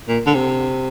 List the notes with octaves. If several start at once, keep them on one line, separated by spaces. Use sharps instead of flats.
A#2
D3
C3